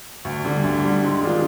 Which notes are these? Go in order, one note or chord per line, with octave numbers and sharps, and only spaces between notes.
D2
D3 G3
D2
D3 G3
G#2
D#3 G#3 D4 F4